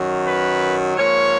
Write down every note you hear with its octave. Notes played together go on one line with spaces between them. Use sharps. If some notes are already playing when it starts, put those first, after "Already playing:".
Already playing: F#2 D#3 F#3
B4
G#2 F3 A#3 C#5